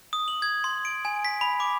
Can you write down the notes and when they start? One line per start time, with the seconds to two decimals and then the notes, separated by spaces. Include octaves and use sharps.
0.13 D#6
0.28 F#7
0.42 G#6
0.64 C6
0.85 D7
1.05 G#5
1.25 B6
1.41 B5
1.60 D6